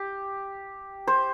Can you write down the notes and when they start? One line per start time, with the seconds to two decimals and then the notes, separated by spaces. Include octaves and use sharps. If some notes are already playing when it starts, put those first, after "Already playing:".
Already playing: G4
1.07 C5